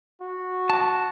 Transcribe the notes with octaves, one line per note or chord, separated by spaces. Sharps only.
F#4
A5